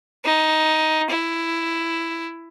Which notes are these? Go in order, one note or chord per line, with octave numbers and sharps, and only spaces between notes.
D#4
E4